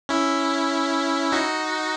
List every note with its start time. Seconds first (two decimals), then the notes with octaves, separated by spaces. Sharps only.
0.09 C#4 E4
1.32 D#4 F#4